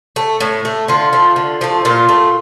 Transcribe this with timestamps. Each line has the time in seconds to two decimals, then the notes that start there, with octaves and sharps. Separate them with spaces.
0.16 A3
0.40 A2
0.65 A3
0.88 D3 F4
1.13 F3 A3
1.36 D3
1.61 F3 A3
1.85 A#2 F4
2.09 A3